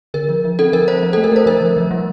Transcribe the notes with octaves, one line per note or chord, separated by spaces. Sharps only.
D3 A#4
F3
F3
C4 A4
F3 A#4
C4 C5
F3
A4
A3
A#4
A3 C5
F3 A#4
F3
F3
G3